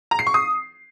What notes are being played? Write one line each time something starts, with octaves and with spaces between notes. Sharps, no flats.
A#5
C7
C#6
D#6